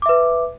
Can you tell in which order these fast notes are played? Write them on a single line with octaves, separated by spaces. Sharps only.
D6 E5 B4